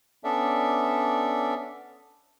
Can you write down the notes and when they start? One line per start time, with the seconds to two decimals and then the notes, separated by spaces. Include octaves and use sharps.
0.24 B3 C#4 D4 A4 D5 E5